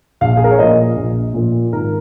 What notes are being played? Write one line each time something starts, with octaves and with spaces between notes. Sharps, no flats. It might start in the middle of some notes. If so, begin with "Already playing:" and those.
A#1 F5
G#4
A#4
C#5
A#2 F3 D#5
A#1
A#2 F3
G#1 A#4